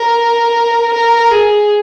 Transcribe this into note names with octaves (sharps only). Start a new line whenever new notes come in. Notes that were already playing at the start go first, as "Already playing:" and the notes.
Already playing: A#4
A#4
G#4